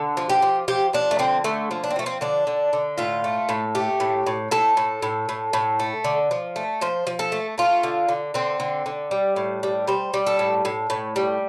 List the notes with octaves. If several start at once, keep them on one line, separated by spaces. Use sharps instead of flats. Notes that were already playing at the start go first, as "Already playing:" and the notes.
Already playing: D3
F3
G4
F3
F3 G4
F3 D4
A3
D3 C4
D3 A3
F3
D4
C4
F3 A3
C4
D3 D4
D3
D3
A2 F4
A3
A2
A3 G4
A2
A2
A2 A4
A2
A2
A2
A2
A3
D3
F3
A3
F3 C5
F3
A4
A3
A3 F4
D3
D3
D3 C4
D3
D3
G3
A2
G3
G3 C5
G3
A4
A2
A2
A2
G3